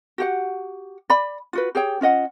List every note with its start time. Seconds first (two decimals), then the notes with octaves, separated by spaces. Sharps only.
0.18 F#4 G4 F#5
1.10 D5 B5
1.53 F4 F#4 B4
1.75 G4 G#4 C#5 G5
2.01 C#4 F4 D#5 F#5